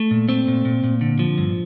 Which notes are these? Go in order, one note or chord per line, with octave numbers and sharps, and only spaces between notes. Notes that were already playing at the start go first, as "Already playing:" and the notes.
Already playing: A3
A#2
A3 C4
A#2
A#2
A#2
D3
F3
G2